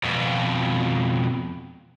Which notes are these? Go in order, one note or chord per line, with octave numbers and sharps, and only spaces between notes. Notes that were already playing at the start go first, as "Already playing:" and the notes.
F2 B2